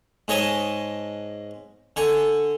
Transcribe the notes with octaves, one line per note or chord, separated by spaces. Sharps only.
G#2 G#3 C#5 D#5 G#5 A5
D3 G#5 C#6